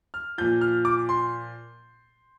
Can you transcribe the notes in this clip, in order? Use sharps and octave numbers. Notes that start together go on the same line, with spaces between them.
F6
A#2 F3 G6
F6
D6
C6